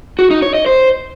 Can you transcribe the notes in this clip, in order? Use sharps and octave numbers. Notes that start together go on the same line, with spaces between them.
F#4
D#4
C#5
D#5
C5